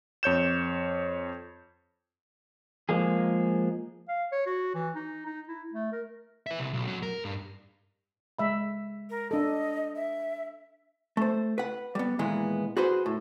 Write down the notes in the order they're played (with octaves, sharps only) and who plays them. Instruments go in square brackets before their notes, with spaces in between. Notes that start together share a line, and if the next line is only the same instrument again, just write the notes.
[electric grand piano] F2 C#5 G6 E7
[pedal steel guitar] F3 G#3 A#3 G#4
[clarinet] F5
C#5
F#4
E3
D#4
D#4
E4
A3
A#4
[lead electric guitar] B4 E5
C2
B1
F#2 F#3
A#4
G2
[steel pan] G#3 E5 B5
[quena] A#4
[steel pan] D4 A4 [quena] D#5
[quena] E5
[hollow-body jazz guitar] A3 C5
B4 F#5
G3 B3
A#2 D#3 E3 G#3 B3
F#4 G#4 B4 C5
A2